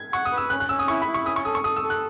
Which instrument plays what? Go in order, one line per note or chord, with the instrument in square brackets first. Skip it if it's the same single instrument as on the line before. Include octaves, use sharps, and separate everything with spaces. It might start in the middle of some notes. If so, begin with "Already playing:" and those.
Already playing: [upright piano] G#6
[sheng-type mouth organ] F#5 [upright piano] C#6
[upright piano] D#6
[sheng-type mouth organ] B4
[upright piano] E6
[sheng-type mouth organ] C#4 [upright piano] F#6
[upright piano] F#6
[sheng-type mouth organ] C#4 [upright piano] E6
[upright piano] D#6
[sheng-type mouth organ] E4 [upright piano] C#6
[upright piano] B5
[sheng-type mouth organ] E4
[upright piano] C#6
[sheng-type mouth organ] C#4 [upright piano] D#6
[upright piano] C#6
[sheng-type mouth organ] A4 [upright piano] D#6
[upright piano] C#6
[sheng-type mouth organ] A4 [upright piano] D#6
[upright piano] E6
[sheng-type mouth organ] A4
[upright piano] F#6